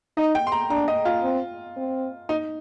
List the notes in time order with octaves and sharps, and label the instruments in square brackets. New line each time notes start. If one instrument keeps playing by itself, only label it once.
[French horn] D#4 [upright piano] D#5
[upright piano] G5
C6
A#5
[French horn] D4 [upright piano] A#5
[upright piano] D#5
F4
[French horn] C4
C4
[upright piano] D#4